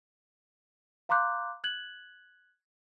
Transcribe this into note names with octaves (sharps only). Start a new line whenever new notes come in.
F5 A#5 C6 D6 F#6 G6
F#6 G#6 F#7